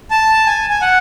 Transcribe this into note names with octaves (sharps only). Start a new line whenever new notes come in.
A5
G#5
G#5
F#5